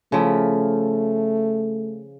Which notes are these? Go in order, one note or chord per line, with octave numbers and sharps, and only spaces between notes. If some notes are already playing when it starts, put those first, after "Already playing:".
C#3 F3 A3 E4